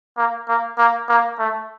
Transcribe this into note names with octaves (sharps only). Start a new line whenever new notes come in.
A#3
A#3
A#3
A#3
A3